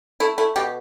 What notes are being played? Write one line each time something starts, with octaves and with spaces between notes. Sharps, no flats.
A3 E4
A3 E4
B2 G4